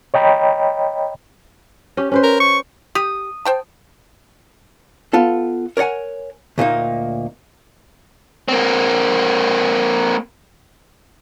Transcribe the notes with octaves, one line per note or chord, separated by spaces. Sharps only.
C#5 D#5 G5 A#5 B5
C#4 G4
C#4 B4 C5
A#4
C#6
G4 D#6
C5 G5 A5
B3 F4 A4
A#4 C#5 D5 F#5 G#5
D2 A#2 A#3 D#4
A#3 C4